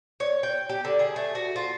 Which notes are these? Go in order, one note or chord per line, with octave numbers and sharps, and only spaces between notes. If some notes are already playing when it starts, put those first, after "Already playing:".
C#5
G5
G4
D3
G#4
A3
F#4
F4